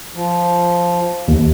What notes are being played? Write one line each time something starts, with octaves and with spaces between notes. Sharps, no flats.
F3
D#2